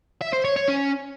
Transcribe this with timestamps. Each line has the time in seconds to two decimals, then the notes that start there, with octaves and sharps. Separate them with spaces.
0.21 E5
0.33 C5
0.45 C#5
0.56 C#5
0.68 C#4